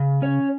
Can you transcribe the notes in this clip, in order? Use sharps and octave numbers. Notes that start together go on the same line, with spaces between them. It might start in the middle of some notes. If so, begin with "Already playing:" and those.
Already playing: C#3
C#4 C#5